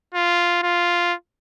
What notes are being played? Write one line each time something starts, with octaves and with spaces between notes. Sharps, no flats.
F4
F4